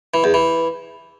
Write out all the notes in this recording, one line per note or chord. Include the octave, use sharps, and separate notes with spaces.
E3
E2
E3